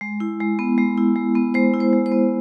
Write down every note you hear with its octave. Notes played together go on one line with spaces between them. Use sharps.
G#3
E4
G#3
B3
G#3
E4
G#3
B3
G#3 C5
E4
C5
G#3
C5
B3